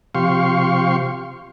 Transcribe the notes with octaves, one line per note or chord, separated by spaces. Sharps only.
C3 F3 G4 F5 C6 C#6